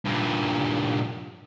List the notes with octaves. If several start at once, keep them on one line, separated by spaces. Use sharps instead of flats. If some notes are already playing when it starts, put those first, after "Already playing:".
G2 A#2